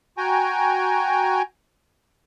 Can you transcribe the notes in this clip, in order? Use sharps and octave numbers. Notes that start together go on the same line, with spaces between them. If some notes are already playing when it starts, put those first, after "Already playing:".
F#4 G5 G#5 A#5